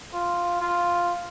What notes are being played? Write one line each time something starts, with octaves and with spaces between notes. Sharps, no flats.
F4
F4